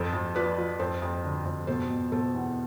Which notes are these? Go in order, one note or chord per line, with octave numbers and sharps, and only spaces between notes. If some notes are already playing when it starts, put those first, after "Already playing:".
Already playing: F2 A4 C5
F2
F3 B4 D5
F3
F2 A4 C5
F2
D3
F2
B2 A4 C5
B2
B2 A4 C5
E2